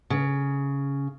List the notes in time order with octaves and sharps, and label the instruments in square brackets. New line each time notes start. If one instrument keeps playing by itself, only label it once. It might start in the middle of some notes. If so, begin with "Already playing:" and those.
[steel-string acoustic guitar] C#3